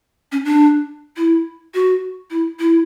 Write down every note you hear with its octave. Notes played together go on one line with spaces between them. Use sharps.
C#4
D4
E4
F#4
E4
E4